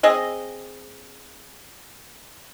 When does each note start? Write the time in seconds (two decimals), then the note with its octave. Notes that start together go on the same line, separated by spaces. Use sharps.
0.03 C4 G#4 D#5